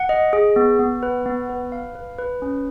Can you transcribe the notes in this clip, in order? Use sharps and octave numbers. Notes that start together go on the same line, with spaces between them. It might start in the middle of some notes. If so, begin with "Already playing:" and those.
Already playing: F#5
D#5
G#4
B3
B3
B4
B3
B4
F5
B4
B4
C#4